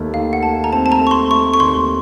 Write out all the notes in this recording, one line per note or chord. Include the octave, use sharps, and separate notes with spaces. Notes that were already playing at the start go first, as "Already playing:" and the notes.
Already playing: D#2 A3
D#3 F5
F#5
A3 A5
A#5
C4 A5
A5
A#5
A3
C#6
C6
A3 C#6
C#6
D#2 C6